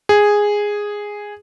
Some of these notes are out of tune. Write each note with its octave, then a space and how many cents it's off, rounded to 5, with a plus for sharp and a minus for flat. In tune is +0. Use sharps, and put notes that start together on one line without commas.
G#4 -5